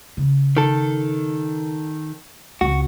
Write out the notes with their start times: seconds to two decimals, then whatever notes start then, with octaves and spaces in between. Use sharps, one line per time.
0.17 C#3
0.57 D#3 A4
2.61 C#2 C4 F#4